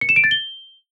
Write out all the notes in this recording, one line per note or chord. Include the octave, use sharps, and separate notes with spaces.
C#7
E7
D7
A6
G7